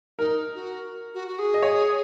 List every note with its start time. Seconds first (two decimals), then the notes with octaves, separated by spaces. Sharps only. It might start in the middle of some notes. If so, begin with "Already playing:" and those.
0.18 D#4 A#4
0.54 F#4
1.14 F#4
1.27 F#4
1.38 G#4
1.54 D#5
1.62 C#5